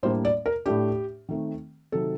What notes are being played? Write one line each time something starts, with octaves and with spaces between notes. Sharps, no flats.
A2 G3 A#3 D4 C5
D5
A#4
A2 A3 D4 G4
D#3 A3 C4
C3 D#3 F#3 A4